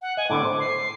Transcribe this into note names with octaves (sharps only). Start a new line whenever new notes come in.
F#5
D#5 G#5
A2 D3 B3 D6
C5
C7